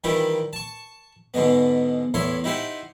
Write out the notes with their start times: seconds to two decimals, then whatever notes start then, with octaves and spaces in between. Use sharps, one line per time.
0.04 D#3 E3 G3 E4 F4 G4
0.53 A5 C#6
1.34 G#2 B2 D3 G#3 B3
2.14 E2 A2 E4 C#5 C6
2.44 D#4 E4 G4 C5 F#5